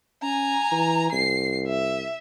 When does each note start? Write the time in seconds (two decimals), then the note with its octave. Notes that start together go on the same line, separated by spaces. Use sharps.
0.23 C#4 G#5 A#5
0.72 E3
1.12 C2 C7
1.67 E5